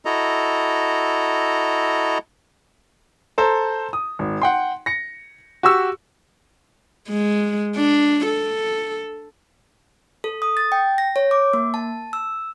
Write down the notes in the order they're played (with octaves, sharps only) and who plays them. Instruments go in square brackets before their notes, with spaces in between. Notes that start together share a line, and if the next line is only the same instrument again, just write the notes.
[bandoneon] E4 F#4 A4 D#5 A#5
[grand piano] A4 C5 A#5
D#6
G#1
F#5 G5 C6
A#6 C#7
F#4 G4 C#6 E6
[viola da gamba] G#3
D4
A4
[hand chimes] A4
D#6
A6
G5
A#6
C#5
D6
A#3
A5
E6